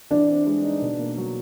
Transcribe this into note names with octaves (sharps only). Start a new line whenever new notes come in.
E3 D4
C4
G#3
D#4
B2
A#3
F#3